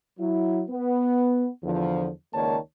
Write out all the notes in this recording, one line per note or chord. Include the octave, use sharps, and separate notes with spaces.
F#3 E4
B3
E2 D3 F3
C#2 D#3 A#3 C#5 D5 A5